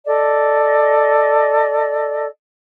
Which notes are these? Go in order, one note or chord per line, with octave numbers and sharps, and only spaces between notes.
A4 D5 D#5